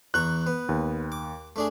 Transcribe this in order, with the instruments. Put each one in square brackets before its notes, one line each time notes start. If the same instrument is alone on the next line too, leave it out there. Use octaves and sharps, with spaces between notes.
[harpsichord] E2 A#5 C#6 [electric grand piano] F#6
[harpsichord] B3
[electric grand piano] D#2
[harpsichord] D6
A3 D4 G#4